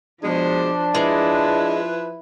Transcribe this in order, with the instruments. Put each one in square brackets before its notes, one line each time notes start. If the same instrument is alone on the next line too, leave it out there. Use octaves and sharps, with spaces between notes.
[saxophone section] B2 G#3 [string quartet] F3 C5 [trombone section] D4
[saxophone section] F3 B4 [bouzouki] G#3 [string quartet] E4